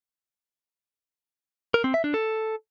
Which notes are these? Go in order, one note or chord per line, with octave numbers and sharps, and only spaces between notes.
A#4
C4
E5
D4
A4